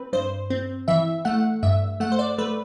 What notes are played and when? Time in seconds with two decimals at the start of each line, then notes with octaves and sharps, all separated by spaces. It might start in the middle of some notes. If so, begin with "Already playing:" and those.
Already playing: C4 B4
0.13 G2 C5
0.50 C4
0.88 E3 E5
1.25 A3 F#5
1.63 G2 E5
2.00 A3 F#5
2.12 C5
2.19 D5
2.38 A3 B4